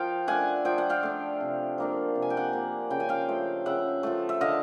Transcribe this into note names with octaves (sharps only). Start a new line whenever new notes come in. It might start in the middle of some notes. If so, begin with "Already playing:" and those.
Already playing: F3 F5 G5
A3 D4 F#5 G#5
F3 G5
F#5
F5 G5
A3 D4
C3
F3 A#3 D4
C3
G#5
G5
F#5 G#5
F3 A#3 D4
C#3 G5
G#5
F5 G5
F3 A3
C#3 E5 F#5
F3 A3
E5
D3 D#5 F5